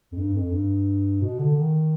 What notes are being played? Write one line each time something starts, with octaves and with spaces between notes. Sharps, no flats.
F2
G2
F2
G2
B2
D3
D#3